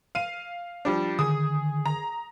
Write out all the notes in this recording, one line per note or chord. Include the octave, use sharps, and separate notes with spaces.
F5 D#7
F3 G3 D4
D3 D#3 G#4 D#6
A#5